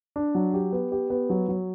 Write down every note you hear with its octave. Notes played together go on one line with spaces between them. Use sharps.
D4
F#3
G4
B3
G4
B3
F#3
F#3